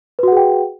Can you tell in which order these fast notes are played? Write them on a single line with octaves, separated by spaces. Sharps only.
B4 F#4 F#5 G#4 G5